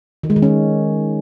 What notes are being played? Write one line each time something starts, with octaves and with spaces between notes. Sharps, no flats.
D#3
G#3
D#3
C#4